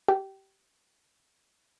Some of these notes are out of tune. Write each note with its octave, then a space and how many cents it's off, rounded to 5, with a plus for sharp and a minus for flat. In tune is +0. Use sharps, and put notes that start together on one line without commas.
G4 -20